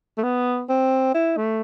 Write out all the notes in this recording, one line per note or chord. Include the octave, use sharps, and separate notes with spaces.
A3
B3
C4
E4
A3